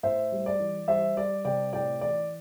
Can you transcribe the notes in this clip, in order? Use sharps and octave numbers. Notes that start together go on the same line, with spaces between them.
A2 C5 E5
G3
D5
E3
G3 C5 E5
G3 D5
C3 D5 G5
A2 D5 G5
E3 D5